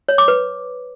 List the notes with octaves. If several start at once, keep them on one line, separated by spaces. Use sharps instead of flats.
C#5
D6
B4